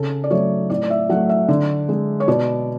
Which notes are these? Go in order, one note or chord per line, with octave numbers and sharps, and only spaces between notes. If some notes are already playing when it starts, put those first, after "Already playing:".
Already playing: C#3 A4
D5
F#3 A3 C#5
A2 D5
D5
E5
F#3 A3 F#5
E5
D3 D5
G#3
C#5
B2 D5